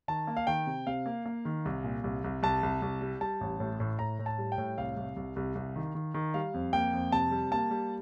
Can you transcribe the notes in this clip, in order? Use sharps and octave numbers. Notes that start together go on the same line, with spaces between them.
D#3 A5
A#3
F5
D#3 G5
C3
C3 F5
A#3
A#3
D#3
C2
A#2
C2
C2
C2 A5
C2
C2
G3
G3 A5
A1
A2
A2
A2 A#5
A2
A5
G3
G5
A2
C2 F5
C2
C2
C2
C2
D#3
D#3
D#3
G3 F5
F2
A#3 G5
F2
C3 A5
G3
A#3 A5
G3